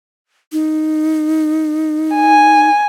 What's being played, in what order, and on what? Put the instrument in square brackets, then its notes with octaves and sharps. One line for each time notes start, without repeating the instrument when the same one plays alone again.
[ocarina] D#4
[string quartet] G#5